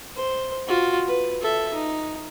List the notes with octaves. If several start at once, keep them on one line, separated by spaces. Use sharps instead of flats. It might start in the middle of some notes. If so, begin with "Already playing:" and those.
C5
F4 F#4
B4
A4 E5
D#4